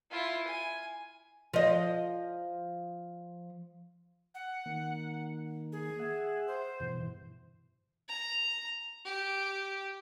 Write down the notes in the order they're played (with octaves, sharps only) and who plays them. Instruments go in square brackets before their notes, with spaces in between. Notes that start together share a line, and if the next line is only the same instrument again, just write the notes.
[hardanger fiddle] E4 F4
G#5
[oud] F3 D#5
[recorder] F#5
[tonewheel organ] D#3 A#3
[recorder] G#4
[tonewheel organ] E5 F#5
[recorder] C5
[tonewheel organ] G2 B2 E3
[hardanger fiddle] A#5
G4